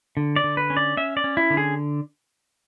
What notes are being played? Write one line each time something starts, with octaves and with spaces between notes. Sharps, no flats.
D3
D5
D3
B4
C#4
D5
C#4 E5
D5
C#4
E4
D3
G#4